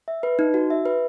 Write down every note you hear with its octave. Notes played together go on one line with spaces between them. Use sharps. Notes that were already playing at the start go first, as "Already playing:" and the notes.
E5
B4
D#4
F#4
E5
B4